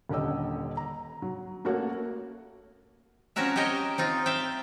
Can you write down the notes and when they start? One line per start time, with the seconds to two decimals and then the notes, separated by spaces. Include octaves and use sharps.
0.09 D#1 D3 C#4 G4 D#5 E6
0.77 A#5
1.22 F#3
1.65 A3 A#3 C#4 F#4 C#5 F#5
3.36 F3 C4 C#4 F#4 A#4 E5
3.56 G4 A#4 C#5 D#5 G5 G#5
3.98 C4 D#4 F4
4.26 E5 F5 G5